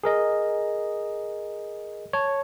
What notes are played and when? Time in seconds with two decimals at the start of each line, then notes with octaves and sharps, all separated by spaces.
0.04 G#4 A#4 D#5
2.13 C#5 A5